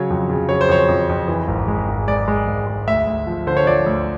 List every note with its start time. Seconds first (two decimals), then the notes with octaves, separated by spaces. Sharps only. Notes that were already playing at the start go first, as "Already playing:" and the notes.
Already playing: C#3 F#3 C#5
0.10 F2
0.30 C#3
0.49 F#3 C#5
0.61 C5
0.69 F2 C#5
0.88 F2
1.09 F2
1.28 E3
1.48 G#1
1.68 G#3
1.88 G#1
2.07 G#3 D5
2.28 G#3
2.47 G#1
2.67 G#3
2.87 D2 E5
3.07 D2
3.27 F3
3.47 D3 C5
3.57 C#5
3.66 F3 D5
3.86 D2